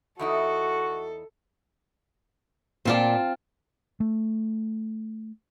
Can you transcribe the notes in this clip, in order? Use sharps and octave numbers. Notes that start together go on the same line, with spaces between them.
E2 D#4 E4 F#4 A4
A#2 C4 F4 D5 A5
A3